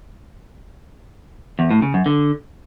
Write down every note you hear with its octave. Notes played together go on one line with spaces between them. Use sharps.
E2
A2
C#3
F#2
D3